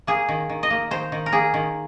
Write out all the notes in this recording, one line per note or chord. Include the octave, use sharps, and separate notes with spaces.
A#3 G#4
D#3
D#3
D#5
A#3
D#3 C5
D#3
A#4
A#3 G#4
D#3